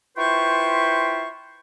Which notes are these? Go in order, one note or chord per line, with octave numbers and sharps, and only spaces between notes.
E4 F4 B4 C5 G5 C#6